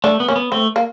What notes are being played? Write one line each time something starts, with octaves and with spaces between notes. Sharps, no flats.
A3 D4
B3
A#3 C#4
B3
A3 C4
A#3